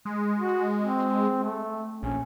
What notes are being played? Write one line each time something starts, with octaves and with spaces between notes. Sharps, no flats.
G#3
F#4
C4
A3
A#1 C#4